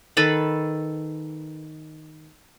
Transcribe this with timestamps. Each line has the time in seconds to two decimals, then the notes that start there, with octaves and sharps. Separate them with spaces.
0.17 D#3 A4 B4 B5